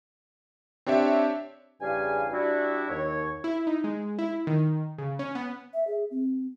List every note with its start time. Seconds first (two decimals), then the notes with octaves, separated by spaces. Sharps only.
0.86 C4 D4 G4 C#5 E5
1.81 E2 G2 C#3 G3 F5 G#5
2.32 G3 D4 E4 F#4
2.89 D#2 C#5
3.44 E4
3.67 D#4
3.84 G#3
4.19 E4
4.47 D#3
4.98 C#3
5.19 C#4
5.35 B3
5.74 E5
5.87 G#4
6.11 C4